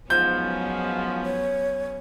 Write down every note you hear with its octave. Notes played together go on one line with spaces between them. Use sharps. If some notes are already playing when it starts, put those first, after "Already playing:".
G#2 F3 F#3 B3 C#4 G6
C#5